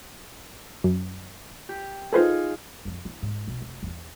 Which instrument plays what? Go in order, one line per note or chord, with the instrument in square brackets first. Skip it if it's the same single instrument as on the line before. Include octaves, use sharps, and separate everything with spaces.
[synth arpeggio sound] F#2
[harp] G4
[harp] D#4 F4 G#4 [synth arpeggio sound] A4 B4 C5
[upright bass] F2 F3
E4
G#2
B1
F1
E2 E3